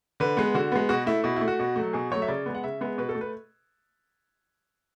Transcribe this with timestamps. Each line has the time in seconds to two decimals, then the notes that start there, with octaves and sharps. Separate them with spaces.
0.20 D3 B4
0.37 G#3 B3
0.54 D3 F#4
0.72 G#3 B3
0.89 B2 F#4
1.06 A3 E4
1.24 B2 E4
1.36 E4
1.41 A3
1.48 F#4
1.59 B2
1.76 F#3 A3
1.93 B2 G#4
2.10 F#3 A3 C#5
2.22 E5
2.28 C#3 D5
2.46 G#3 B3
2.55 F#5
2.64 C#3 E5
2.81 G#3 B3
2.98 B2 B4
3.09 A4
3.15 A3
3.21 B4